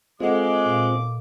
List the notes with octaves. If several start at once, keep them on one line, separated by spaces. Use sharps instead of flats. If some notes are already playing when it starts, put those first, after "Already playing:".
G#3 C4 F4 A4 D#5 F#5 D6
A#2 F5